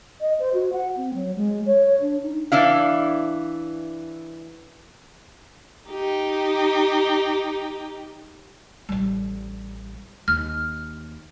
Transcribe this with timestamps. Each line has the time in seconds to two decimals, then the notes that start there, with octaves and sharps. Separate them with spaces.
0.21 D#5
0.40 C5
0.54 F#4
0.73 F#5
0.97 C4
1.14 F#3
1.36 G#3
1.66 C#5
2.01 D4
2.23 D#4
2.52 E3 D4 E4 F5
5.90 D#4 G4
8.89 A1 G3
10.28 D#2 F6